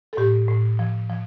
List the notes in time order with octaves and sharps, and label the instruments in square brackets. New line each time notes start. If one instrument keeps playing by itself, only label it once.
[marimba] A4
A2 G4
A2
F3
F3